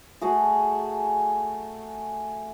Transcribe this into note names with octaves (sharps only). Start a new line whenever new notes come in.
A3 F#4 G#4